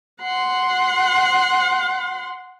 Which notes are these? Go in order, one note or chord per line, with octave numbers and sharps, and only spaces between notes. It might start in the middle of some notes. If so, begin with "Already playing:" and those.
F#5 C6